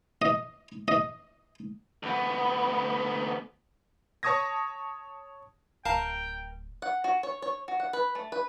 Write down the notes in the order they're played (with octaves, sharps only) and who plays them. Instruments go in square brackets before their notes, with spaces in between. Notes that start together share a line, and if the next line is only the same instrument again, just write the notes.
[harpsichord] D#5
D#5
[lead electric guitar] D2 B3
[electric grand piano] C#5 A5 C#6 D#6 G#6 A#6
[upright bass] D1 [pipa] A#4 [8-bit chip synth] F5 A5 [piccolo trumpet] G5
[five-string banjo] F#5
F#4
C#5
C#5
F#4
F#5
B4
A3
B4